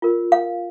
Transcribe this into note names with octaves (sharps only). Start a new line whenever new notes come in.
F4 A#4
F5